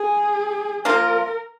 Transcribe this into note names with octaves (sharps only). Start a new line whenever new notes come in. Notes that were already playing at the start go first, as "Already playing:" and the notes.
Already playing: G#4
F3 A#3 F4 A#4